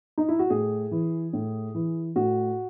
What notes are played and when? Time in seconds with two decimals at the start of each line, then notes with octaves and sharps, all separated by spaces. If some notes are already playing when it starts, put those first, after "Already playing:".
0.18 D#4
0.29 E4
0.39 F#4
0.50 A2 G#4
0.91 E3
1.33 A2
1.75 E3
2.16 A2 F#4